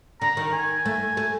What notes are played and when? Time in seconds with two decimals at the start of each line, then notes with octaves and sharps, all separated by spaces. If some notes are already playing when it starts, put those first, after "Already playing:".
0.22 D3 A#5
0.37 D#3
0.53 G#5
0.86 A3
1.17 A3